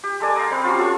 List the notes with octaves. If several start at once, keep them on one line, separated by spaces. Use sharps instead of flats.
G4
G#3 A4 D5 G#5
F5 G5 A#5 D#6
C4 F5 B5 D6
F#3 G3 C#4 F4
F4 A4 C#6